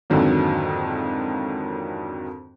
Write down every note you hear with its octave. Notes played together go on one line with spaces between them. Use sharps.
F2 G#2 D3 D#3 F#3 A#3